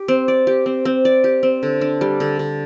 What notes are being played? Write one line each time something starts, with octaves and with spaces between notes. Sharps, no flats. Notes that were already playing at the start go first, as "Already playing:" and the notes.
Already playing: G4
C4
D5
G4
C4
C4
D5
G4
C4
D3
D4
G3
D3
D3